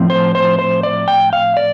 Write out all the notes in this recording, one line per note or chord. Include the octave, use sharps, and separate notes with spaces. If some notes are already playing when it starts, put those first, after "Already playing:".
Already playing: A2 F3 C4
C5
C5
C5
D5
G5
F5
D5